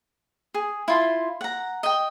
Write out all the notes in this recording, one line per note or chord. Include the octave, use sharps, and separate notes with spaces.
G#4
E4 F4 C6
F#5 A#5
D#5 G5